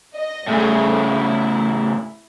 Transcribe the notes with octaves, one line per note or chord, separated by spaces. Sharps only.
D#5
A2 C#3 G3 A3 G#4
E4